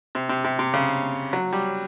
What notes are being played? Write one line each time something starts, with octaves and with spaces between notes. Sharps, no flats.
C3
C3
C3
C3
C#3
F#3
G3